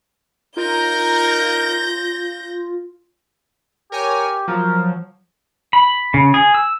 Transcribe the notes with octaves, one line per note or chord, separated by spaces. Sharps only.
D#4 F4 A#4 G6 A#6
G4 A#4 C#5 G#5
F3 F#3 A#4
B5
C#3
G#4
E6